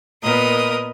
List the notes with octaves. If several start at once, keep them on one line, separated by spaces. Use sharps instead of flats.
A#2 B3 A#4 D#5 D#6